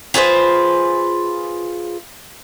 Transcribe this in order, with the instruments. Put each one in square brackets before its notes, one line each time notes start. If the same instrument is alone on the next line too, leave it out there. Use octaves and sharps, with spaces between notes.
[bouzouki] F4 G#4 B4 C5